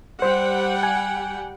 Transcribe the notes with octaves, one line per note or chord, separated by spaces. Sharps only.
G3 C5 F#5 G5
G#5